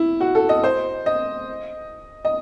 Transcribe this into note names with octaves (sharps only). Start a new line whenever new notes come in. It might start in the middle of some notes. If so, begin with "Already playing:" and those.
Already playing: E4
F#4
A4
D#5
C5
D#5
D#5